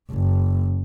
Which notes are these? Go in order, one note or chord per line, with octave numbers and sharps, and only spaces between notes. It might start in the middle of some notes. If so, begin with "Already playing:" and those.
F#1